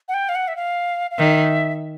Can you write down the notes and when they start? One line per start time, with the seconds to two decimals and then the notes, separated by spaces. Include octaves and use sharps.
0.08 F#5
0.14 G5
0.29 F5
0.35 F#5
0.48 E5
0.56 F5
1.11 F5
1.18 D#3 E5